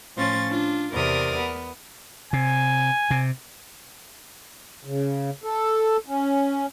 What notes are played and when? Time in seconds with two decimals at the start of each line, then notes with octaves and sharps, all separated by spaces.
0.16 A2 F3 C#4 F4 A6
0.49 D4 F4
0.91 E2 C3 A#4 D5 D#6 F6
1.38 B3
2.33 C3 G#5
3.11 C3
4.85 C#3
5.44 A4
6.06 C#4